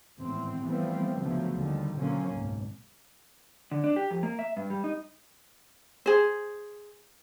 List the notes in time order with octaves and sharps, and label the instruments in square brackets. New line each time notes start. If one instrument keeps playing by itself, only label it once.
[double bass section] G#1 E2 A2 C4
E3 F3 G3 A3 B3 C4
D2 C#3 F3 F#3 A3 B3
D#2 D3 D#3 G3
B2 D3 F3 F#3 A#3 C#4
G#1 C#2 F#2 B2
[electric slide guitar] D3
D4
G4
F2
A#3
E5
G2
G3
D#4
[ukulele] G#4 C5